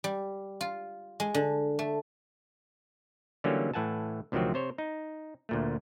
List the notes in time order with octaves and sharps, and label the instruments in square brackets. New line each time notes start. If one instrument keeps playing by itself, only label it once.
[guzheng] G3
F4
G#3
D3
A3
[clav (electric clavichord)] D3 E3 F#3 G3 A#3 C#4
A2 E3 F#5 G#5 A5
D2 C3 D#3 F3 F#3 C4
C3 C5 C#5
D#4
D2 A#2 A3